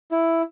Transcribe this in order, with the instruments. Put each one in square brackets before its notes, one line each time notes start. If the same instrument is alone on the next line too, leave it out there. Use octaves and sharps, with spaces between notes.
[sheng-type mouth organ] E4